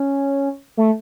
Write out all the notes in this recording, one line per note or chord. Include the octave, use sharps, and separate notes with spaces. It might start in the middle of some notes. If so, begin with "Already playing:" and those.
Already playing: C#4
A3